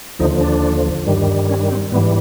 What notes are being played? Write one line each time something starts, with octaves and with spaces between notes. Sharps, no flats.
D#2 D3 F3 D#4
D4
G2 D#3 G3
C#4
C4
G#2 E3 G3 B3